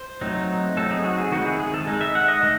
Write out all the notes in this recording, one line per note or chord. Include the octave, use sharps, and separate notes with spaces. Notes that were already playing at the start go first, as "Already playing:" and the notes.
Already playing: C5
F#3 A3 C4 D#4
F#3 A3 C4 D#4 A4
G#4
F#4
G#4
D#3 G#3 C4 E4 F#4
G#4
G#4
A4
G#3 D#4
E5
F#5
D#5
D#3 A3